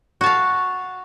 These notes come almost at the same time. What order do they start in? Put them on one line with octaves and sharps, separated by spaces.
F#4 A5 F5